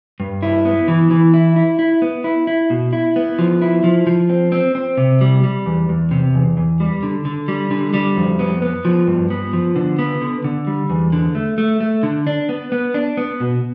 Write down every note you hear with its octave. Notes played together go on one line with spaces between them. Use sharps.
G2
E4
B3
E3
E3
E4
E4
E4
B3
E4
E4
B2
E4
B3
F3
E4
F3
F3
C4
C4
C4
C3
G3
G3
E2
E2
C3
E2
E2
G3
D3
D3
G3
D3
G3
F2
B3
B3
F3
G2
B3
F3
D3
B3
D3
D3
G3
E2
D3
A3
A3
A3
D3
D4
B3
B3
D4
B3
B2